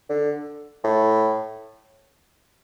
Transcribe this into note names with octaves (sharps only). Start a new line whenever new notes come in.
D3
A2